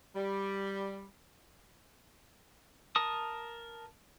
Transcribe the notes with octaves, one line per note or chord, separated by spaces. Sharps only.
G3
A#4 A5 D#6